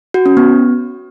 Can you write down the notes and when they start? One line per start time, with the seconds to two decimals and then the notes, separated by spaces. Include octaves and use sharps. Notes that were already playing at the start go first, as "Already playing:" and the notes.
0.14 F#4
0.26 C#4
0.37 B3